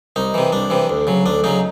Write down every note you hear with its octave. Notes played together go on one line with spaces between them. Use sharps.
C2 D#4
C3 E3
C2 D4
C3 E3
D2
C#3 F#3
D2 D4
C#3 F#3 D#4